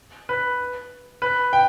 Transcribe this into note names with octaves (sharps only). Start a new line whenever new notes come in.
B4
B4
G5